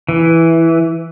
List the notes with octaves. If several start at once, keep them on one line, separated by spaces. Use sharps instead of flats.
E3